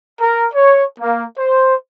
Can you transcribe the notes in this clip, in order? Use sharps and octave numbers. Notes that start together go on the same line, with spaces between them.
A#4
C#5
A#3
C5